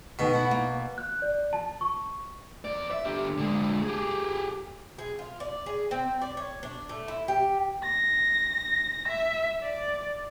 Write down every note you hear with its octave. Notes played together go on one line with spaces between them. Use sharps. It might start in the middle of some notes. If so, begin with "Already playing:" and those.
G2 B2 D3 D#3
E4 F#5
A#3
F#6
D5
A5
C#6
E2 D5
E5
D3 G4
D3 G#3
G4 G#4
G#4
F4
D5
G#4
C4
D5
C#5
D4
A3
E4
G4
A#6
E5
D5